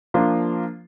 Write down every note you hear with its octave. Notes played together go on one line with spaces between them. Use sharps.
F3 A#3 D4 F4